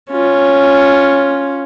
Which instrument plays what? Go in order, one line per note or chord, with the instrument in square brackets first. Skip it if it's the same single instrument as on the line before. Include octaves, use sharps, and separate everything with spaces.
[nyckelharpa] C#4 F4